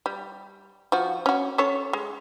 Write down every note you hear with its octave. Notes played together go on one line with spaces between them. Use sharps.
G3
F3 F#4
C#4 F#4
C#4 A4 C#5
G#3